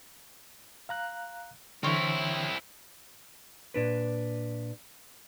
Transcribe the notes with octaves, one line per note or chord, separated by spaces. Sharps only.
F5 A#5 F#6
D3 E3 C4 E4 A#4 C5 C#5
A#2 D4 B4